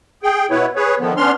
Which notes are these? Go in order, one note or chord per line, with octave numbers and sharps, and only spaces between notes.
G#4 G5
B2 B3 E4 B4 C#5
G#4 B4 C#5
D3 D#3 F3 B3
B3 C#4 D4 C6 F6